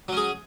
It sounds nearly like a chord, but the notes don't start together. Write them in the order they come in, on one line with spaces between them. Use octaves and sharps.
F#3 C#4 G#4